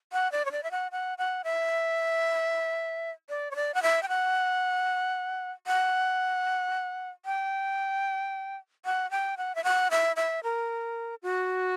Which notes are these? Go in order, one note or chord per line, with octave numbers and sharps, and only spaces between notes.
F#5
D5
C#5
D5
E5
F#5
F#5
F#5
E5
D5
C#5
D5
F#5
E5
G5
F#5
F#5
G5
F#5
G5
F#5
E5
F#5
E5
E5
A#4
F#4